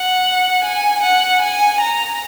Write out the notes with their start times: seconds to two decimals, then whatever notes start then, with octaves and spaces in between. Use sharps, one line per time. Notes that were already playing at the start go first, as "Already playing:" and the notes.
Already playing: F#5
0.64 G#5
1.03 F#5
1.42 G#5
1.81 A#5